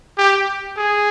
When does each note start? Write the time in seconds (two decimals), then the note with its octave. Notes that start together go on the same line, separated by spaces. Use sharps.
0.18 G4
0.77 G#4